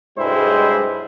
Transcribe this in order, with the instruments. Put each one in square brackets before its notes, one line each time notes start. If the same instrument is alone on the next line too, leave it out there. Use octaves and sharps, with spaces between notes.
[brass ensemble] B1 G3 G#3 [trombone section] G2 E4 C5